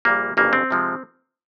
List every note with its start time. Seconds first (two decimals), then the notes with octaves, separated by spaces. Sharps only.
0.05 A#1 A#2 G3 A#3
0.37 G1 F2 C#3 F#3 A#3
0.53 C4
0.71 C3 F3 G#3